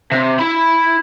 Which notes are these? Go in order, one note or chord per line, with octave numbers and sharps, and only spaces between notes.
C3
E4 B5